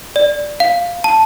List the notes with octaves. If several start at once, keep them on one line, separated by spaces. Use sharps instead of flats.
D5
F5
A5